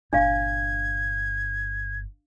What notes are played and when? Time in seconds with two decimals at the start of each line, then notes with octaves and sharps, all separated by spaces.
0.13 G1 A#2 D4 F5 G#6